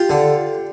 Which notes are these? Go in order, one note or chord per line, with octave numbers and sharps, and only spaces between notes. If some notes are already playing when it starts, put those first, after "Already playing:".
Already playing: F4 G4
D3